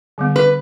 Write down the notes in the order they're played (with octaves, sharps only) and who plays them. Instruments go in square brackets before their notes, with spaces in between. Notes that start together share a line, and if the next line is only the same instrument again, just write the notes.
[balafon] D3 G3 B3
[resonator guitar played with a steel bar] B4